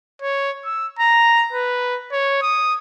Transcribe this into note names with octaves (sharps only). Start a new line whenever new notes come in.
C#5
E6
A#5
B4
C#5
D#6